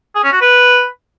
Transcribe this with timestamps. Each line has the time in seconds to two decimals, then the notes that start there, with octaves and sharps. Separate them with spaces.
0.15 G#4
0.24 C#4
0.32 F#4
0.41 B4